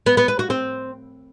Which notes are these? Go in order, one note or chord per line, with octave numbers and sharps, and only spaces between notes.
B3
B3
B4
F#4
C4